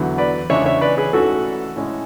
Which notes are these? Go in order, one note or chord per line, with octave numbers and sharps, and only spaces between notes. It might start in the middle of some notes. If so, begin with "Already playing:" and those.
Already playing: E2 D3 F#3 B3
B4 D5
E2 C#3 G#3 D4 C#5 E5
C#5 E5
B4 D5
G#4 B4
G#2 E3 A3 C#4 F#4 A4
A2 G#3 C#4